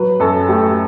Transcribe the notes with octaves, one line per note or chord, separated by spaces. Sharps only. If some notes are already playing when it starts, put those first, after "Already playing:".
Already playing: F#3 B4
F#2 A4
A3 G4